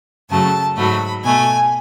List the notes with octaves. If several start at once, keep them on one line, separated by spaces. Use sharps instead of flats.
F#2 C#3 F#3 A3 A5
G#2 F#3 A3 B5
B2 A3 G#5